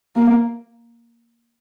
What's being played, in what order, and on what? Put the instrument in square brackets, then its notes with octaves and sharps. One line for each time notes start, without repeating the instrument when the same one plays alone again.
[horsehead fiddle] A#3